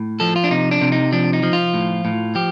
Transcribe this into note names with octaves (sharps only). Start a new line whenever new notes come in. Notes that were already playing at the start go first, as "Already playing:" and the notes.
Already playing: A2
F3 A4
F4
D4
C3 D#4
D4
C3
D#4
F3 D4
D#4
F3
F4
A2
A2
F3 G4